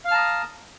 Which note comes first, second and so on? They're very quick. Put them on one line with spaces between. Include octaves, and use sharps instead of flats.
F5 F6 A5 A#5 D#6